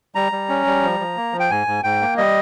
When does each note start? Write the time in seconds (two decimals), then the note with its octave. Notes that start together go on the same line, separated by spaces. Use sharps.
0.15 G3 A#5
0.32 G3
0.49 C#4
0.66 G3
0.82 F3
1.00 F3
1.17 A#3
1.33 F3
1.40 G5
1.50 G#2 G#5
1.67 G#2
1.84 G#2 G5
2.01 A#3
2.17 G3 D#5